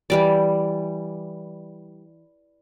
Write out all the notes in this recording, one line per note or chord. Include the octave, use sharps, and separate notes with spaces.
E3 G3 D5